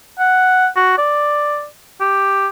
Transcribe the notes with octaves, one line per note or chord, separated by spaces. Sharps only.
F#5
F#4
D5
G4